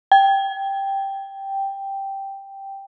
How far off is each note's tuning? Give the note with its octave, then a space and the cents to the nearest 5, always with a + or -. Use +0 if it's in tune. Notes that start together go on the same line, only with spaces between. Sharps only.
G5 +0